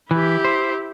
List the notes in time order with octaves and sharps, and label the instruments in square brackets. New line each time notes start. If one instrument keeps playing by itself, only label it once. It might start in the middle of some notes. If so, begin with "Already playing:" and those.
[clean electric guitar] E3 [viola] E4 G4
[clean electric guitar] C5